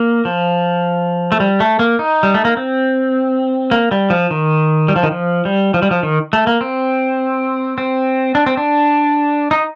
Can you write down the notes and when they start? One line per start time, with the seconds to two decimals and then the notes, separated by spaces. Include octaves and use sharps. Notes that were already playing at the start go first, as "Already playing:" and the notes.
Already playing: A#3
0.25 F3
1.32 A3
1.40 G3
1.60 A3
1.79 A#3
1.99 D#4
2.23 G3
2.34 A3
2.45 A#3
2.57 C4
3.71 A#3
3.91 G3
4.10 F3
4.31 D#3
4.88 G3
4.96 F3
5.03 D#3
5.11 F3
5.45 G3
5.74 F3
5.82 G3
5.91 F3
6.03 D#3
6.33 A3
6.47 A#3
6.61 C4
7.78 C4
8.35 D4
8.46 C4
8.57 D4
9.51 D#4